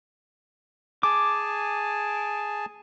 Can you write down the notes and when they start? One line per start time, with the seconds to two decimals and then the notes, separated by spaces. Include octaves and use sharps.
1.03 G#4 G#5 A5 D6